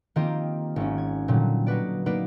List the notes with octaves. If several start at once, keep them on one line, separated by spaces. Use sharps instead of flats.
D#3 A#3 C4 F4 G4 D#5
G#1 C#4
G#6
A#2 D3 F#3 G3
D#4 F#4 B4 D5
A#3 B3 D#4 B4 D5